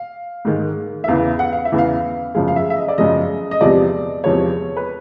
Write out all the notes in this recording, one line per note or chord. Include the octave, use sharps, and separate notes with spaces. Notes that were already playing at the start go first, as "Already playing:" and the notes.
Already playing: F5
G#2 D#3 G#3
E5
E2 C#3 E3 F5
F#5
F5
E5
E2 C#3 E3
F5
F#2 C#3 F3 G#3 F5
F5
E5
E5
D#5
D5
F#2 C#3 F3 G#3 D#5
D#5
E2 C3 F3 G#3 D5
E2 C3 F3 G#3 C#5
B4